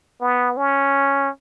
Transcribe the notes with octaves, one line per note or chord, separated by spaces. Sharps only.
B3
C#4